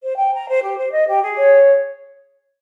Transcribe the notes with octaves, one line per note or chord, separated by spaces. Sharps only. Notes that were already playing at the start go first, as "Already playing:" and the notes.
C5
G5
A#5
C5
G4
C5
D#5
G4
G#4
C#5